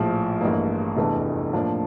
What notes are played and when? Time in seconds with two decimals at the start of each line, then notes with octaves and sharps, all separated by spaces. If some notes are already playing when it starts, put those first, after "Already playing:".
Already playing: A#1 A2 F3
0.41 A1 G2 E3 A#3
0.97 F1 E2 E3 A3 D4
1.53 A2 F3 A#3 D4